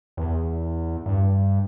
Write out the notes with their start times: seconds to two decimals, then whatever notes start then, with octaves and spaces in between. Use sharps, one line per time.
0.17 E2
1.06 G2